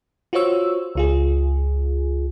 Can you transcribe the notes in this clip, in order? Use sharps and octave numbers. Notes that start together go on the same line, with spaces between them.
F4 F#4 C5 C#5 E6
C#2 F4 G#4